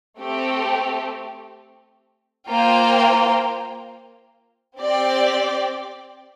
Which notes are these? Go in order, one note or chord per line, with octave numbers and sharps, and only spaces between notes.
A3 C4 G4
A#3 F4 C5 G5
C4 G4 D5 G5